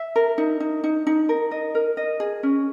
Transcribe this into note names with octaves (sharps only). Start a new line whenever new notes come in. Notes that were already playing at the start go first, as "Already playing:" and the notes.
Already playing: E5
A#4
D#4
D#4
D#4
D#4
A#4
D#5
A#4
D#5
G#4
C#4